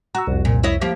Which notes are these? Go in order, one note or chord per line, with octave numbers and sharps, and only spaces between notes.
F#4 A#5 E6
C2 F2
A#2
E4 C#5 D#5
F3 A#3 G4